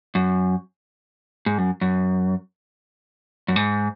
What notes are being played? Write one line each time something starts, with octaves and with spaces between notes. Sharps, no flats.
F#2
G#2
F#2
F#2
F#2
G#2